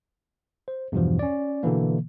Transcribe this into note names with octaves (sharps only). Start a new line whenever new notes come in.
C5
E2 G2 B2 E3 F3
C#4 D5
B2 D3 E3 A#3